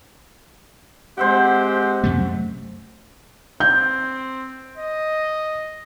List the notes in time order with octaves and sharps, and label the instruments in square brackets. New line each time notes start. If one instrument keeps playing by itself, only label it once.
[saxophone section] G#3 C4 G4 [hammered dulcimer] C5 E5 F#5
[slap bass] F#2 C3 A3
[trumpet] C4 [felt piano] G6
[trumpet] D#5